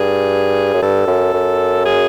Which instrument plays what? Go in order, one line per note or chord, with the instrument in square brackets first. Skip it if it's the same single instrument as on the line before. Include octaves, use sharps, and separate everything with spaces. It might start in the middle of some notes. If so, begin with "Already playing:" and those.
Already playing: [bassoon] G2 [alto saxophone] G#4
[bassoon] F#2
[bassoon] G2 [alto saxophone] A4
[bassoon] F#2
F#2
[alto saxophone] G#4